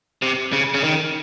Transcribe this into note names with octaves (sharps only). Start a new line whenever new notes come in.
C3
C#3
C#3
D#3